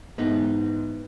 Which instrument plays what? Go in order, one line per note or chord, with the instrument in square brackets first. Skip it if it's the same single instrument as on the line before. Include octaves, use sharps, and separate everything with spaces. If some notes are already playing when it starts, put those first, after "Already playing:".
[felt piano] G#2 E3 [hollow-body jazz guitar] B3 D#4